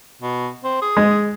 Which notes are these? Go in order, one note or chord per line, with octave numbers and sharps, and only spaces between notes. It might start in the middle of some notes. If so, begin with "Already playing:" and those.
B2
C4
G#4
G#3